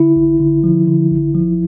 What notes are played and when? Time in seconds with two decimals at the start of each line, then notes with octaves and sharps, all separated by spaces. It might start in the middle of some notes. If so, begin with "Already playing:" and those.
Already playing: D3 E4
0.16 A1
0.40 D3
0.64 F3
0.88 D3
1.11 A1
1.35 F3